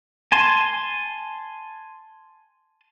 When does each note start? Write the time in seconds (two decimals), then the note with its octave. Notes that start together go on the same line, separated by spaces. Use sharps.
0.32 G#5 A5 C6